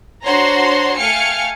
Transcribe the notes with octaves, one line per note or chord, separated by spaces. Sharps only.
D4 F#4 C5 C#5 A#5 C6
A3 F5 G5 G#5 F6 C#7